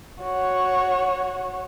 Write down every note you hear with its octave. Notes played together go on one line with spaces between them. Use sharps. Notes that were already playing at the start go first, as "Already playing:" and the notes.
F#4 C#5